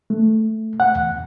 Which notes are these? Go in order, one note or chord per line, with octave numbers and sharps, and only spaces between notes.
A3
F#5
E2